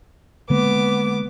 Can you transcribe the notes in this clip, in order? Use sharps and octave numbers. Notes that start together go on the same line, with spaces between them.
D3 G#3 A#3 B3 D6